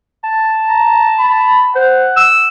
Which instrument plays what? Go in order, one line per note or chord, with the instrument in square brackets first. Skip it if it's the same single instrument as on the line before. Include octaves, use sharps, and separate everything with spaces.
[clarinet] A5
[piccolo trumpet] A#5
B5
[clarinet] C5 [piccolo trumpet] F#5
[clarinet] E6